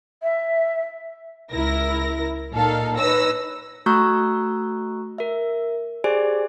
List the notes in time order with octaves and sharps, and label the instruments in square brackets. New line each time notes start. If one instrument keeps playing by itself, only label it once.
[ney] E5
[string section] C#2 E4 A#4 A#6
A#2 A#3 D#4 A4 F5
D#4 B4 C#5 E6 A#6
[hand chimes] A3 F#4 A#5 C#6 E6 F#6
A#4 E5
G4 G#4 C5 D5 G#5